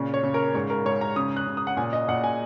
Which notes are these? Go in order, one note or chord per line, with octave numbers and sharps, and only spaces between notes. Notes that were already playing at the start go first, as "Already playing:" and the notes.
Already playing: A#2 C#3
C#5
C#3
A#4
G#2 C#5
A#4
G#2 C#5
A#5
C#3 D#6
F#6
C#3
D#6
F#5
A#2 G#5
D#5
A#2 F#5
G#5